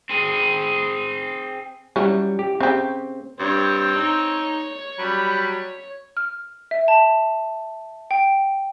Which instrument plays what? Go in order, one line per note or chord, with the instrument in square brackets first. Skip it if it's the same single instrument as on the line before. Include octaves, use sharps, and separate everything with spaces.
[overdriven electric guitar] C4 G#4
[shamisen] E3 F#3 C#4 [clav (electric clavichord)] G3
[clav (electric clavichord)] G4
[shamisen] C#3 G4 [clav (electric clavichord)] C4
[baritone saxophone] G2 [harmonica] C4 [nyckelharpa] C#5
[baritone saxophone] D#4
[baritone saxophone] F#3 [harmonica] G3 B5
[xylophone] F6
E5
A5
G5